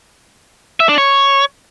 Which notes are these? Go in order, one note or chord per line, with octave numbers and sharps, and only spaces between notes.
E5
D4
C#5